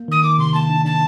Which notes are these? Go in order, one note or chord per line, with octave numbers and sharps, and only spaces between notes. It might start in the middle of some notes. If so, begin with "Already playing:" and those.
Already playing: A#3
D#3 D#6
D#3 D6
C3 C6
A#3 A5
D4
D4 A5